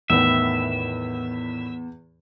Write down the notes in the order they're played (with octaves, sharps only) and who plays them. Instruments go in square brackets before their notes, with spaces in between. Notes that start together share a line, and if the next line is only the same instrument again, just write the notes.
[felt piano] E2 [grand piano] A2 D#3 B3 [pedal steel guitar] E5